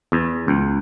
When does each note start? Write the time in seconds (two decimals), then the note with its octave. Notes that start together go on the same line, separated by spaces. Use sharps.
0.12 E2
0.48 C#2